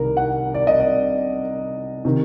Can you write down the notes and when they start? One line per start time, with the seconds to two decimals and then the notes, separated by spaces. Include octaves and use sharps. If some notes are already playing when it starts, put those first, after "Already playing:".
Already playing: C2 C3 D#3 A#4
0.17 F#5
0.54 D5
0.67 D#5
0.80 D5
2.05 C3 D#3